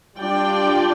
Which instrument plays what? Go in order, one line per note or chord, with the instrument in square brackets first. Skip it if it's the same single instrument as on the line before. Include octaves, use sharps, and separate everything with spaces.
[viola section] G3 D4 F4 D5 G5